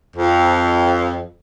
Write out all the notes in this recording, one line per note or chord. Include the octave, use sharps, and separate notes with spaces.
F2